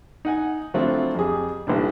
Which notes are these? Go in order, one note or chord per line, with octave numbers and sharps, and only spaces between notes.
D#4 F#5 G#5
F3 F#3 A3 C4 D4 E4
F2 G4 G#4
B1 E3 G3 D4